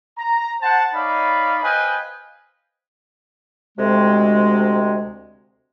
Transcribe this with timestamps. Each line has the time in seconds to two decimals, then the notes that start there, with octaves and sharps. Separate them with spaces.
0.18 A#5
0.62 C5 F#5 A5
0.94 D#4 C#5 D5 F5 B5
1.64 B4 C5 D#5 F5 G5 G#5
3.78 D2 C3 G#3